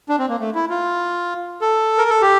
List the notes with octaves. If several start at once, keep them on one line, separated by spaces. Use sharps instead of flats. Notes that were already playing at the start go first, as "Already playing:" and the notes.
D4
C4
A#3
A3
E4
F4
A4
A#4
A4
G4